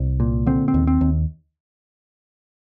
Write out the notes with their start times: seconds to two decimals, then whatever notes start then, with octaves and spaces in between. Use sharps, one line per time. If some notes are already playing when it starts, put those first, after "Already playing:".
Already playing: C2
0.20 A#2
0.46 D3 C4
0.68 C4
0.74 D#2
0.87 C4
1.01 D#2